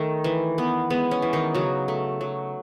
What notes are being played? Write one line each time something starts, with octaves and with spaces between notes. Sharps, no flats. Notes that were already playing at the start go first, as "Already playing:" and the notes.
Already playing: D#3 A3
E3
B3
G#3 B3
C#4
E3
D#3 D#4
C#3 F#3 F#4
A3
F#3